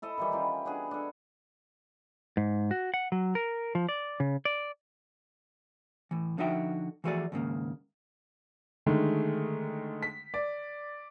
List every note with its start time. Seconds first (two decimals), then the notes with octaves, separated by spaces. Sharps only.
0.02 E4 A4 D#5
0.18 D#3 E3 G3
0.32 C#4 F4 G4 A#4
0.65 B3 D4 F#4 G#4
0.91 D4 A4
2.37 G#2
2.71 F#4
2.94 F#5
3.12 F#3
3.35 A#4
3.75 F3
3.89 D5
4.20 C#3
4.45 D5
6.11 A2 E3
6.38 D3 F3 D#4 F#4 E5 G5
7.04 E3 F3 A3 F#4 G#4 D5
7.32 D#2 G#2 C#3 A#3
8.86 D3 D#3 G#3 A3
10.02 B6
10.34 D5